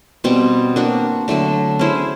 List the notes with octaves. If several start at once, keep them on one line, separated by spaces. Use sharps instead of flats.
B2 G3 C4
A#3 D4 F#4
D3 F#3 A3 D4
C#4 E4 G#4 C5